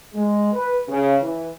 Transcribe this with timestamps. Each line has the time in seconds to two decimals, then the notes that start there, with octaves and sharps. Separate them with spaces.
0.14 G#3
0.53 B4
0.89 C#3
1.22 E3